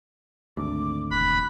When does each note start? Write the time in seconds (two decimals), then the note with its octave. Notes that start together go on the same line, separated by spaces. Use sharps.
0.57 G#1 D2 D6
1.11 E1 B5 F#6